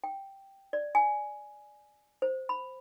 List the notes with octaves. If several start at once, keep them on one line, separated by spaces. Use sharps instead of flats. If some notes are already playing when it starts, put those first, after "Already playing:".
G5
D5
G#5
C5
B5